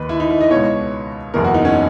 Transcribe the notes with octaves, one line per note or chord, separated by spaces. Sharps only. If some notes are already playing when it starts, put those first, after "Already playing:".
Already playing: D#2 D#3 B4
E4
D#4
E4
D#5
C#2 B2 C#5
F#1 E2 B2 A#4
F#4
D#4
C#4